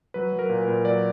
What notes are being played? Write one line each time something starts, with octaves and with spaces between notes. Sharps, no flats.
F#3 B4
F#3
A#4
A#2
B4
A#2
F#3 D5